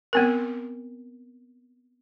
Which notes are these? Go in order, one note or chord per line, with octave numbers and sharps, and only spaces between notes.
B3 C4 A#4